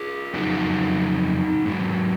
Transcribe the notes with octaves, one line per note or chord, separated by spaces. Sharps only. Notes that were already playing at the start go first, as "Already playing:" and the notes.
Already playing: F4 G#4
F2 C#3 F#3 D#4 F#4
G#2 F#3